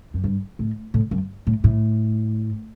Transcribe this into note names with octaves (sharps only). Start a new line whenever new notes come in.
F#2
G2
A2
A2
F#2
A2
A2